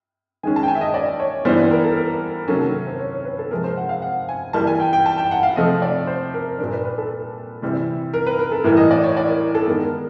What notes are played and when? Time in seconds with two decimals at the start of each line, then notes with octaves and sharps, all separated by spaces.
0.43 D#3 G#3 C#4 G#5
0.56 A5
0.63 G5
0.68 G#5
0.75 E5
0.81 D#5
0.94 D5
1.20 C#5
1.45 E3 G3 B3 D4 C5
1.58 B4
1.71 A#4
1.84 A4
1.97 A#4
2.48 C3 D#3 F#3 A#3 C#4 A4
2.61 A4
2.74 A#4
2.87 C5
2.99 C#5
3.13 C#5
3.25 B4
3.39 A4
3.50 C3 F3 G#3 A#4
3.64 C5
3.77 F#5
3.89 F5
4.02 F#5
4.29 G#5
4.53 E3 G3 A#3 A5
4.67 G#5
4.80 G5
4.93 G5
5.06 A5
5.18 G5
5.31 F#5
5.43 F5
5.56 C3 F3 A3 C4 D#5
5.82 D5
6.07 C5
6.34 A#4
6.59 A#2 G3 A#3 D4 A#4
6.72 B4
6.85 B4
6.98 A4
7.62 C3 E3 G3 C4
8.14 A#4
8.27 B4
8.39 A#4
8.52 A4
8.64 A2 E3 G3 A#4
8.77 D#5
8.91 D5
9.04 C#5
9.17 D5
9.29 A#4
9.55 A4
9.67 D#3 G#3 B3 A#4
9.84 A#4